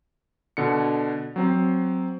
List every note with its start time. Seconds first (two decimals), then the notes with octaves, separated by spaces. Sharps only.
0.57 B2 D3 C#7
1.36 F#3 C4